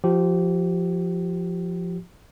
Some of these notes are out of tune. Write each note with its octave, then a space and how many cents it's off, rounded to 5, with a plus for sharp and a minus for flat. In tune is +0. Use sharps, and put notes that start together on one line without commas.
F3 +0 G4 -25